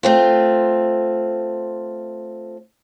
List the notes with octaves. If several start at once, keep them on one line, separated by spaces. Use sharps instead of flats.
A3 C4 F4